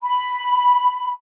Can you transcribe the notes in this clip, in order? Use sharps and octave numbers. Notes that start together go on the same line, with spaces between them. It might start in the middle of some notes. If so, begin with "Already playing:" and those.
B5